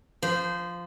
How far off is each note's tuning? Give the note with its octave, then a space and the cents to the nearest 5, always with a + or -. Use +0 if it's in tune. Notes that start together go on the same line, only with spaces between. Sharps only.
F3 +0 C5 -20